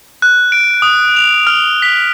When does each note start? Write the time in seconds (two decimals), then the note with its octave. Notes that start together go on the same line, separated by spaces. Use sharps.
0.22 F#6
0.52 D7
0.82 D#6
1.16 F7
1.47 F6
1.82 B6